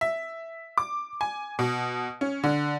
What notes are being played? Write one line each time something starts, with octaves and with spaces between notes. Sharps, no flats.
E5
D6
G#5
B2
C#4
D3